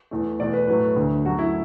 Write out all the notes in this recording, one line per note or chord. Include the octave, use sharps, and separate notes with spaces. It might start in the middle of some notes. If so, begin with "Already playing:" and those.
E2 E3 A3
E2 B2 A3 D5
B4
A2 F#3 A3 B4
D2 D3 F#3 A3
F#2 F#3 A3 F#4
E4